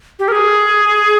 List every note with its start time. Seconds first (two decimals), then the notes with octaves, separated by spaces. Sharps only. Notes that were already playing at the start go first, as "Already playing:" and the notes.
0.19 G4
0.28 A#4
0.32 G#4